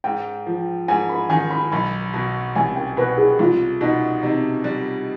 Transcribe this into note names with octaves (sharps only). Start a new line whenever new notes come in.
G#2 G5
F3
G#2 G#5
B5
D#3 G#5
B5
B1 B5
B2
C2 G#5
G5
B2 B4
G#4
C2 F4
B2 D#4
C3 D#4
G3